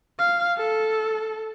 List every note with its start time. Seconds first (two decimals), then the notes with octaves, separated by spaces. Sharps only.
0.19 F5
0.57 A4